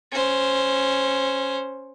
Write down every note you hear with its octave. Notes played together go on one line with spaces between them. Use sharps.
C#4 C5